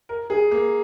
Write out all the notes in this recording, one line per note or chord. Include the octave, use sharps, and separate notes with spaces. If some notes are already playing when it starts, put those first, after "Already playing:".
A#4
G#4
A#3